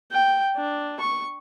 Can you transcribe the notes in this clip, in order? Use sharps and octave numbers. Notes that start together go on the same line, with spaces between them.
G5
D4
C#6